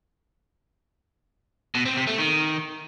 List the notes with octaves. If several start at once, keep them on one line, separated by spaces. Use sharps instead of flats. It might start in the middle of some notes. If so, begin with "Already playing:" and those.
B2
C4
C3
A3
D#3